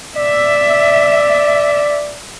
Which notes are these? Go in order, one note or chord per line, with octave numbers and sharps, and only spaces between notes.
D5 E5